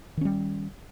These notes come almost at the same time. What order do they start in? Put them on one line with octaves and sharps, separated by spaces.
D#3 C#4 G3